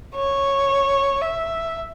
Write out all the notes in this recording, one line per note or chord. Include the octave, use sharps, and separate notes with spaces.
C#5
E5